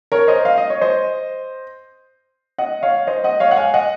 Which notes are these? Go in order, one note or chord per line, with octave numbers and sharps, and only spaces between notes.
A#4 C#5
C5 D#5
F5
D#5
C#5
C5 D#5
D#5 F#5
C#5 F5
C5 D#5
D#5 F#5
C#5 F5
F#5
F5 G#5
D#5 F#5